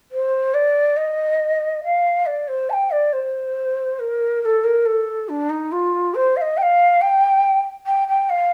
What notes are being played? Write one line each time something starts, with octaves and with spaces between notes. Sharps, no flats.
C5
D5
D#5
F5
D5
C5
A5
G5
D5
C5
A#4
A#4
A4
A#4
A4
D4
D#4
F4
C5
F5
D#5
G5
F5
G5
G5
G5
F5